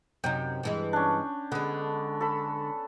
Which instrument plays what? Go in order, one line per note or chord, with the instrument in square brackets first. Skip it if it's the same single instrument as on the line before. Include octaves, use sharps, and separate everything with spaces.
[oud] F#2 C3 D#4 [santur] G5
[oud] G2 E3 G#3
[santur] C#4 D4
[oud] D3 G#3 [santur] B3
[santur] A4 B5